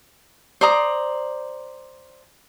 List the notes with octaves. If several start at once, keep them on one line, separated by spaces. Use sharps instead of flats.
C5 D5 A#5 D#6